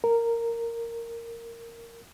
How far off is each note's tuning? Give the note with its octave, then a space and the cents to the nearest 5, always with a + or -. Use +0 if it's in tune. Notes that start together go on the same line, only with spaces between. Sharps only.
A#4 -10